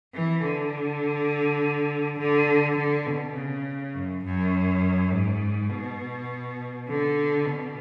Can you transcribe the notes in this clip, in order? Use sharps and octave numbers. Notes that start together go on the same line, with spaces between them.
E3
D3
D3
D3
B2
C#3
F#2
F#2
G#2
B2
D3
B2